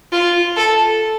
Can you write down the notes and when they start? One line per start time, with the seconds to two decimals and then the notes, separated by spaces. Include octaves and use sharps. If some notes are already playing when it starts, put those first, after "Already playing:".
0.12 F4
0.56 A4